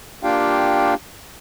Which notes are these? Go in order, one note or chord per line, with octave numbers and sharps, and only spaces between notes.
A#3 D4 F4 G4 F5 G5